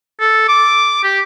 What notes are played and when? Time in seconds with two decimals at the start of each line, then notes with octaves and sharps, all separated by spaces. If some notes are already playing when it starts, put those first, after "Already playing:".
0.20 A4
0.48 D6
1.03 G4